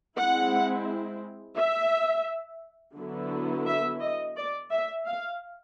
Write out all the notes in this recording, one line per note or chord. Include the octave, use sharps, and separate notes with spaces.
G#3 C4 E4 F#5
E5
D3 F#3 B3 E4
E5
D#5
D5
E5
F5